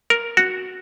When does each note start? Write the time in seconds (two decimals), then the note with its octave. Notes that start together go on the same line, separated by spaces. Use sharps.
0.10 A#4
0.37 F#4